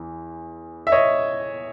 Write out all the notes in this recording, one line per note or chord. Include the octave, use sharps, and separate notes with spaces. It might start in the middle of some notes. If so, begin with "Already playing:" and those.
Already playing: E2 E3
E5
C#5 D#5